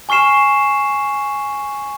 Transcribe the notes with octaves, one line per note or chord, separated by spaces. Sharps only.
G#5 C#6 F6 C7 E7